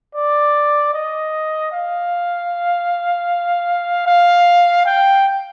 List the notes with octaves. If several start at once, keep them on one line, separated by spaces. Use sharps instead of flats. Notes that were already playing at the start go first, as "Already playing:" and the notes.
D5
D#5
F5
F5
G5